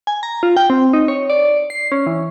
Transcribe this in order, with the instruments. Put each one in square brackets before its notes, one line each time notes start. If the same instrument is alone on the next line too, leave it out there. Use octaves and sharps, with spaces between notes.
[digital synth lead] G#5
A#5
F4
G5
C4
D#4
C#5
D5
C7
C#4
E3